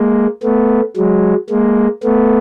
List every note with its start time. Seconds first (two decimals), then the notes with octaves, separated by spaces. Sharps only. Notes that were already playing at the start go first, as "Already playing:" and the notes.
Already playing: G#3 A#3
0.43 A3 B3
0.96 F#3 G#3
1.50 G#3 A#3
2.03 A3 B3